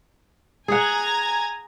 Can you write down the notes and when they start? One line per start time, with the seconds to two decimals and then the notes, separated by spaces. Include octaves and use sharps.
0.68 G#4 F#5 G#5 A#5 G#6